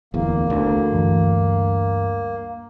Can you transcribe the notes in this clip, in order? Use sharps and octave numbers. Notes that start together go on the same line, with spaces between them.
D1 E2 A#3
D2 D3 D4
G2 E3